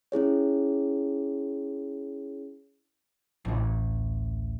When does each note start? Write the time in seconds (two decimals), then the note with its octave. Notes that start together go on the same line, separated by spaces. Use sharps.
0.12 C#4 E4 G#4 C#5
3.45 A1 D2